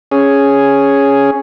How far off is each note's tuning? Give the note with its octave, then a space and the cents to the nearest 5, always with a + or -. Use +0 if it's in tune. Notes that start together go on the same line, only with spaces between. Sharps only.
C#4 +0 G#4 +0